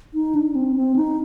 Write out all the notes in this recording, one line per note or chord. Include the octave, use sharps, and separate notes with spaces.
D#4
D4
C4
C4
D#4